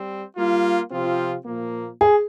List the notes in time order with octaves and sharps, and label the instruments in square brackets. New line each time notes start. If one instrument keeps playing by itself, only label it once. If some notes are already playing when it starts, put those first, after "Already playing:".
Already playing: [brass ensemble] G3 C4
G3 A#3 F4
C3 F3 C4 F4
A#2 F3 A#3
[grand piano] G#4